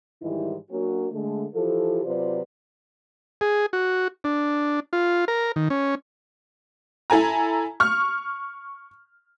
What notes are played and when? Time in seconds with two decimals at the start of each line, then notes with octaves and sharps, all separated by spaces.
0.22 G#2 D#3 E3 G3 D#4 E4
0.70 F#3 A#3 C#4 D4 F#4
1.11 D3 G#3 A3
1.54 E3 F3 F4 G4 A4
2.04 C3 F#3 F4 B4 C5 D5
3.41 G#4
3.73 F#4
4.24 D4
4.93 F4
5.28 A#4
5.56 D#3
5.70 C#4
7.10 E4 A4 G#5 A#5
7.80 C#6 F6